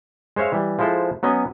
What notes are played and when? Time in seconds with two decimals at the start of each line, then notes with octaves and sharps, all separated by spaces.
0.36 G#3 C5 C#5 E5 F5
0.52 E3 G3
0.79 F3 G#3 E4 A4 C5
1.23 F#3 B3 C#4 D#5 G#5